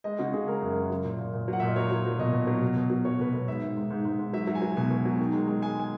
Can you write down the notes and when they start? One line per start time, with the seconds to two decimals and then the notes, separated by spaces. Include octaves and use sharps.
0.04 G#3 D#5
0.19 C#3 F#4
0.33 C#3 G#4
0.47 G#3 A#4
0.62 F#2
0.76 F#2
0.90 F#3
1.05 A#2
1.19 A#2
1.33 A#2
1.48 F#3
1.53 F#5
1.60 A#2 E5
1.68 D#5
1.76 F#3 C#5
1.90 F#3
2.05 F#3
2.18 B2 D#5
2.33 B2
2.47 F#3
2.62 B2
2.76 B2
2.90 F#3
3.05 F#3 C#5
3.19 B2 B4
3.33 B2 C#5
3.47 G#2 E5
3.62 D#3
3.77 G#2
3.90 G#2
4.05 G#2
4.19 G#2
4.33 F#3 E5
4.47 F#3
4.55 G#5
4.62 F#3
4.77 B2 G#5
4.90 B2
5.05 F#3
5.19 D#3
5.33 G#3
5.48 G#3
5.62 G#3 G#5
5.80 G#5